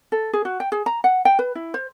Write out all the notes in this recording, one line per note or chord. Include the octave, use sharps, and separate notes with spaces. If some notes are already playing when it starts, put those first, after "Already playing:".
A4
G#4
F#4
G5
G#4
A#5
F#5
G5
B4
E4
C5